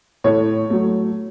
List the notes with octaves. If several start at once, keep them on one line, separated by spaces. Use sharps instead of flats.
A2 C#5
F#3 A3